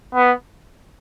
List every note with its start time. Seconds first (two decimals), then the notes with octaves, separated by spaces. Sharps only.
0.14 B3